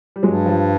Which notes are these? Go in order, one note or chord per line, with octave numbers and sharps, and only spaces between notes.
G3
G2 F#3 G#3
F3 G3